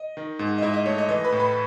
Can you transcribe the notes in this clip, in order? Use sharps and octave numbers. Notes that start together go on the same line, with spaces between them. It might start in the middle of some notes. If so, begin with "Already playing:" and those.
Already playing: D#5
D#3
G#2
D#5
G#2 E4 E5
D#5
A3 C#5
D#5
E3 D#5
B4 B5
A2
B4 B5